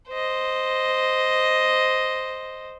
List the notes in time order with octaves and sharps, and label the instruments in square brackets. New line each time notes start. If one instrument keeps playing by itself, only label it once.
[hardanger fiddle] C5 D#5